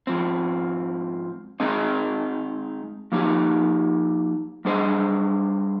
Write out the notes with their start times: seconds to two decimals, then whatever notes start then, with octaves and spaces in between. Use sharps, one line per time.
0.07 G#2 F3 C4
1.60 G#3 C4 D#4 G#4 D#5
3.12 F3 A#3 D#4 G4
4.65 G3 D4 G#4 C5 D#5